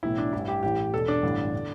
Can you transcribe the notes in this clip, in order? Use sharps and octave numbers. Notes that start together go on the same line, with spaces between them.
B1 A2 E3 E4
D4
A1 G2 E3 E4
G4
A1 A2 E3 G4
E1 E2 B2 A4
D4
A1 G2 D3
D3